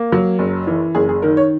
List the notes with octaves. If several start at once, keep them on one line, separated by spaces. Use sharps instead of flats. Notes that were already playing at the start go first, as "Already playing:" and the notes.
Already playing: A#3
F#3
F#1
E3
F#1 G#4
G#4
D#3 A#4
C#5